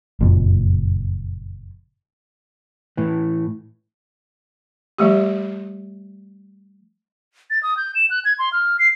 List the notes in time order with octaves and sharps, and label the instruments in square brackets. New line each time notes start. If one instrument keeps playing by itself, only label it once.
[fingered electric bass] F#1 F2 A#2
[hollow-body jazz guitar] A2 E3
[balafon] F3 G3 A3 G4
[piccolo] A6
D#6
G6
E7
F#6
G#6
C6
F6
C7